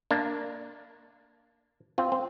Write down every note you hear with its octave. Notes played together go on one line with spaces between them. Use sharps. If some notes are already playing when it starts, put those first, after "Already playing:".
A#3 D4
C4 F4
C4